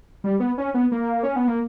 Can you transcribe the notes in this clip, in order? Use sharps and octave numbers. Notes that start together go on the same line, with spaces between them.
G3
B3
C#4
B3
A#3
C#4
B3
A#3